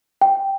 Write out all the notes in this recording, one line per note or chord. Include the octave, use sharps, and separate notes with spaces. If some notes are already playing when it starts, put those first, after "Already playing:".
G5